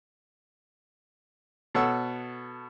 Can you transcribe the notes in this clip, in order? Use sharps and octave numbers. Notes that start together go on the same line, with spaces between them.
B2 A4 C#5 F#5 E6